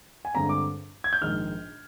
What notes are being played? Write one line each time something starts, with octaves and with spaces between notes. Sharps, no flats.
G#5
G2 D3 G#3 C4 A#5
D6
G#6
G6
A#1 G#2 D#3 G#3 D#4 F6